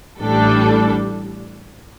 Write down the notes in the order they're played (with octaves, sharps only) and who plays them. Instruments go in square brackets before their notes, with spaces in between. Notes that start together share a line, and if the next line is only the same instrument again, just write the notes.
[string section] A1 A2 G3 D4 A4